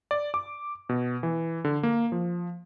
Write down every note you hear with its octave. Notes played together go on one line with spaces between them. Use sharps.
D5
D6
B2
E3
D3
A#3
F3